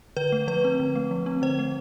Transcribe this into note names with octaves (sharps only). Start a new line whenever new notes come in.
D3 B4
A3
F3 B4
C4
D3
A3
F3
C4
D3 C5
A3